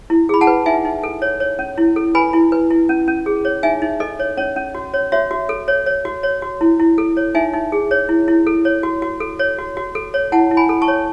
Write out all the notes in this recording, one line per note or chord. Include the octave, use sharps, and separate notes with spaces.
E4
G#4 B5
F#5 A5
B4
D#4 E5 G#5
D#4
A4
C#5
C#5
C#4
E4
A4
B4 G#5 B5
E4
B4
E4
C#4
C#4
G#4
C#5
D#4 E5 G#5
D#4
A4 D#5
C#5
C#4 C#5
C#4
F#4
C#5
F#4 C#5 E5
F#4
A4
C#5
C#5
F#4
C#5
F#4
E4
E4
A4
C#5
D#4 E5 G#5
D#4
G#4
C#5
E4
E4
A4
C#5
F#4
F#4
A4
C#5
F#4
F#4
A4
C#5
E4 F#5 A5
E4
G#5 B5
A4
A5 C#6
C#5